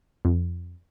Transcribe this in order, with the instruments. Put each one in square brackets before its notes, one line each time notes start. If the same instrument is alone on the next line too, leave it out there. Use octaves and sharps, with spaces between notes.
[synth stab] F2